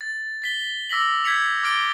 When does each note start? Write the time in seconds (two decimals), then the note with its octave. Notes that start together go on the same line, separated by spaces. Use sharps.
0.01 A6
0.42 A6 B6 G7
0.89 D6 E6 A#6 B6 F#7
1.24 G6 G#6 B6 C#7 F7
1.63 D6 F6 A6 D7 G7